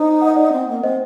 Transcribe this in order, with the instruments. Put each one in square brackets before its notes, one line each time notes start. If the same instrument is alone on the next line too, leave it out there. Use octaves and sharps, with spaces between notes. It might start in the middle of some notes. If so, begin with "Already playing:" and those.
Already playing: [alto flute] D#4 [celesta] C5 D#5
[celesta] F#5
D#5
D5 F#5
[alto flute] C4
A#3
[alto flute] C4 [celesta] C5 D#5